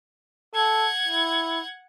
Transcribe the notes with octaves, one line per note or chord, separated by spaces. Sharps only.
A4 F#5 G#6
E4